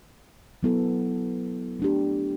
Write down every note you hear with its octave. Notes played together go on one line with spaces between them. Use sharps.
F#3 B3 E4 A4
A3 D4 G4